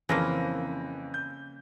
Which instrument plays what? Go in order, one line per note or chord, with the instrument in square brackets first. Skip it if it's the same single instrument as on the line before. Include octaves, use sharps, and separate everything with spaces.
[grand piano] F2 E3 A#6 [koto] C#3 F3 A#3
[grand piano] G6